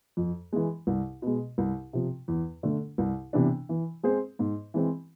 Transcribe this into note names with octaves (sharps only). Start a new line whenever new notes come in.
F2
E3 G#3
C2
B2 G#3
C2
C3 F3
E2
D3 A3 D4
C2
C3 E3 B3 D4
E3
G#3 C4 G#4 C5
G#2
E3 G#3 C4